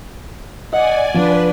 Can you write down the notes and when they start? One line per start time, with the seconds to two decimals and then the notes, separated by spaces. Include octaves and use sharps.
0.73 D5 D#5 F#5 G#5
1.14 F3 D4 B4